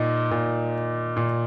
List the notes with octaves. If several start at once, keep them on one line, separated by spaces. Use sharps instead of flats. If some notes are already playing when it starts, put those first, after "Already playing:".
Already playing: A#2 D#4
A#2
A#2